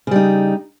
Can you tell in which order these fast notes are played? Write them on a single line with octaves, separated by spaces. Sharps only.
C#3 G3 D#4